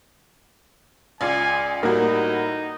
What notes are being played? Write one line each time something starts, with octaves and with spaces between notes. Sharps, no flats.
C#2 F4 D5 G#5
A2 G3 A#3 D#4 F#4